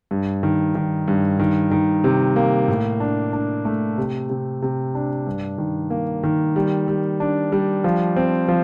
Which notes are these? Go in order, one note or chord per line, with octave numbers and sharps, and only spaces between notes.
G2
D#3
D#3
G2
D#3
D#3
C3
A#3
A2
D4
D4
A3
C3
C3
C3
D4
G2
D#3
A#3
D#3
G3
G3
D4
G3
F3
C4
F3